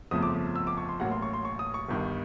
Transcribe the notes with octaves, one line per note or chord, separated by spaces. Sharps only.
G1 F2 C#3 F3 A3 D#6
D6
E6
D6
C#6
C6
A1 A2 F#3 A#3 F#5
C6
C#6
C6
C#6
D#6
C#6
G1 G2 D#3